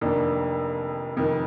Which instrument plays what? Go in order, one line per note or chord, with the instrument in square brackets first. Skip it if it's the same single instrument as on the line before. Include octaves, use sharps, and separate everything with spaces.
[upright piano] F1 F2 D#3 A#3 D4
F1 F2 D#3